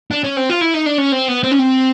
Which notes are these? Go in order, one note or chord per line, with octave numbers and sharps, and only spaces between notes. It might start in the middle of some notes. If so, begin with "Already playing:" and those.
D4
C#4
C4
F4
E4
D#4
D4
C#4
C4
B3
C4
C#4
C4